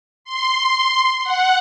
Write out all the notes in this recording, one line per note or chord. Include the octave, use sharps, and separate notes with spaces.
C6
F#5